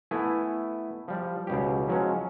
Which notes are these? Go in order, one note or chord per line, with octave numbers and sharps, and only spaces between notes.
A3 B3 E4 G#5
F3 G3
C#2 B2 G4
F3 F#3 G#3 C#4